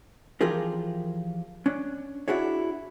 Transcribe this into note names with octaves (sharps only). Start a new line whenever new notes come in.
E3 F3 F4 G4 G#4 A#4
C#4 D4
D4 E4 F#4 G#4 C#5